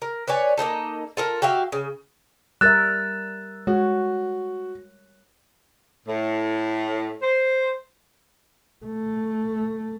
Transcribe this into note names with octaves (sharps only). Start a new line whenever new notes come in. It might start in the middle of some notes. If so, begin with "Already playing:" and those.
A#4
B4 C#5 D5 G#5
A#3 C4 D#4 A4
F4 A4 A#4
F#4 G4 E5 F5
C#3
G3 A#4 E5 E6 F#6 A6
G#3 F#4 C#5
A2
C5
A3